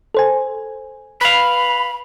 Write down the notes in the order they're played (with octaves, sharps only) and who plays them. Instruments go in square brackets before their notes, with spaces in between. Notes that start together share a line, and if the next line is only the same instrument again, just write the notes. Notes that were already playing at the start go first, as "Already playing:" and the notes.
[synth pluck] A4 C5 G#5
[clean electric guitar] B4 F5 [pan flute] B5